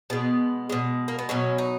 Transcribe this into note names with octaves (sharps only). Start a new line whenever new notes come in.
B2 G#3 B3
B2 G#3
A#3
B3
B2 F#3 C#4
D#4